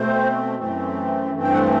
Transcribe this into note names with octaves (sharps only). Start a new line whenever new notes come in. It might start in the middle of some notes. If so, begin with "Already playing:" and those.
Already playing: B2 A3 C4 C5
F#2 E3 A3 C4
G2 E3 A3 C4
G5
F#5